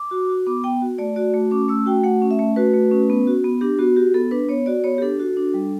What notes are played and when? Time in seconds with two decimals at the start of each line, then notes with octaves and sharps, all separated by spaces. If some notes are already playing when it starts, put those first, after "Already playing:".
Already playing: D6
0.11 F#4
0.29 F#4
0.47 B3 D6
0.64 B3 G5
0.82 F#4
0.98 A3 D5
1.16 F#4 D5
1.34 A3
1.51 C#4 D6
1.69 A3 E6
1.86 F#4 G5
2.04 A3 F#5
2.22 C#4
2.31 E5
2.39 A3
2.56 F#4 B4
2.74 A3
2.91 C#4
3.10 B3
3.27 F#4
3.44 B3
3.61 D4 G4
3.79 B3 F#4
3.96 F#4 G4
4.14 B3 A4
4.31 D4 B4
4.49 B3 C#5
4.66 F#4 D5
4.84 B3 C#5
4.98 G4
5.02 D4 A4
5.20 F#4
5.37 D4
5.54 G3